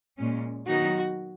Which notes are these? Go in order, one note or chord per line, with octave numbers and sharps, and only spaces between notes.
A#2 G#3 C#4
D#3 F#3 B3 D#4 F#4